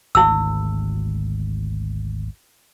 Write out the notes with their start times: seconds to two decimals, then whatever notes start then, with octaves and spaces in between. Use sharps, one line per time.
0.15 G#1 D2 E4 E6